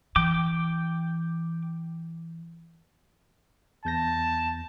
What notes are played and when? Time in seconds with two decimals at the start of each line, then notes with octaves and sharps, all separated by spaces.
0.16 E3 G5 D6
3.85 E2 A5 G6 A#6